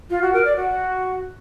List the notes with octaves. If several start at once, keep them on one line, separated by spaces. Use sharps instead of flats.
F4
F#4
A#4
D5
F#4